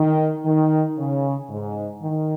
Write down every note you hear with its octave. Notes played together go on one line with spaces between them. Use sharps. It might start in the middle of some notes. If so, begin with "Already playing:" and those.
Already playing: D#3
D#3
C#3
G#2
D#3